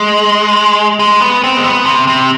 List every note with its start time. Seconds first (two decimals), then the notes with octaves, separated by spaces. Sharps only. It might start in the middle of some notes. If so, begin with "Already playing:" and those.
Already playing: G#3
0.99 G#3
1.21 B3
1.44 C4
1.57 G#3
1.64 B3
1.86 C3
2.07 C3